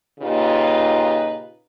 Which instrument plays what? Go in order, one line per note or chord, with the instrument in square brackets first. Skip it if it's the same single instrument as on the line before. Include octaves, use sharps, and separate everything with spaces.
[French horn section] A#2 C#3 D#4 F4 G4 B4